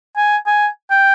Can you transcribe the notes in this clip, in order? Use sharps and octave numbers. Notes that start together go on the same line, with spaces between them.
G#5
G#5
G5